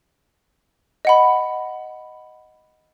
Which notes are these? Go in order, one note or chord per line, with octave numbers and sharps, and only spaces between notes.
D#5 F#5 B5